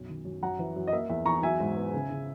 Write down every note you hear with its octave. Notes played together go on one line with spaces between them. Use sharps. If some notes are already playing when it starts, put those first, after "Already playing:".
Already playing: B1 F#2
D#3
F#2
F#2 F#5 A#5
E3
F#2
D#5
A#3 E5
E2 E5
E2 A#5 C#6
F#3 E5 G#5
G#2
B3
C#3
C#3